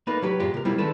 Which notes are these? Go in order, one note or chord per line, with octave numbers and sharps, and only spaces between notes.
A3 A#3 D#4 A4 B4
C2 F#3 G4 B4
F#2 A#2 G#3 F4 G4
C3 A#4
G3 A#3 C4 E4 F4
D#3 G#3 A3 D4 A4 B4